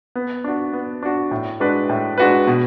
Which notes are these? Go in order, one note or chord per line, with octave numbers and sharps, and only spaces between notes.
B3
D4 F#4
B3
D4 F#4
A2
G#3 D4 F#4 B4
A2
G#3 D4 F#4 B4
B2